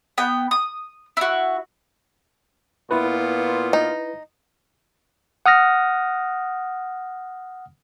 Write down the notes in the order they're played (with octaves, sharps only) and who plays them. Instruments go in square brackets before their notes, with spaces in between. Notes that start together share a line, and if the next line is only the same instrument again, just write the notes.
[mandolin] B3 G5
D#6
E4 F#4
[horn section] A#2 B3 F4 [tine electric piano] E4 B4
[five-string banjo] D#4
[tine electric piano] F#5 D#6 F6 A#6